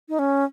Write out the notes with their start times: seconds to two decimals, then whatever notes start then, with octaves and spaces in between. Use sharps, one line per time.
0.09 D#4
0.19 C#4